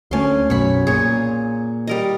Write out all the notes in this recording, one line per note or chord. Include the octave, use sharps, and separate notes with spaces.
D2 A3 C#4 C6
B1 F#2 B2 C#5 B5
A#2 G#4 C#5
G3 A#4 D#5